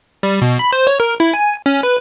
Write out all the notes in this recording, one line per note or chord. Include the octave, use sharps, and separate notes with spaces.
G3
B2
B5
C5
C#5
A#4
E4
G#5
C#4
B4